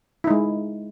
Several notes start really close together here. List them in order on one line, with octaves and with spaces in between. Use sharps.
E4 D#4 G#3